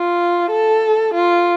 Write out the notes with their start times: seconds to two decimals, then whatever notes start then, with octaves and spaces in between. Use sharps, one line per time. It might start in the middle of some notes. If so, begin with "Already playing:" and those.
Already playing: F4
0.51 A4
1.14 F4